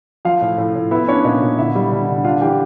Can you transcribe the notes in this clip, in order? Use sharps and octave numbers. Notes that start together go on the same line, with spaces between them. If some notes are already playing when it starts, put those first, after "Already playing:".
F3 F4 F5
A2
A2
A2
B3 E4 E5
C#4 D4 C#5
A#2 D#4 D#5
A#2
D3 E4 E5
G3
D3
D3
D4 F4 F5
E3 G4 G5